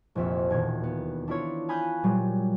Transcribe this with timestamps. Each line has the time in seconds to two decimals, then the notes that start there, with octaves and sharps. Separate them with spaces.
0.15 F1 A#1 F2 E5
0.50 E1 D#2 A#2 G#6
0.83 B3
1.28 D4 E4 F4 C#5
1.69 F5 G#5 B5 D#6 F#6 G6
2.04 A#2 F#3 G3